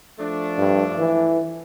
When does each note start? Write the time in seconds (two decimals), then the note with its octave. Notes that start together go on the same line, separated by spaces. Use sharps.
0.19 F3 A3 D4
0.58 G2
0.98 E3